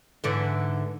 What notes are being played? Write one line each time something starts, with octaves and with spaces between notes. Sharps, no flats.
G#2 D3 E3